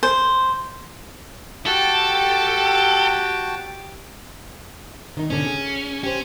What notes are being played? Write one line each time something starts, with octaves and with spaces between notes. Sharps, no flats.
C5
F#4 G4 A4 G5 A5
D#3 D#4
G#2 B2 D3 C#4
G#4
C#4 G4 C5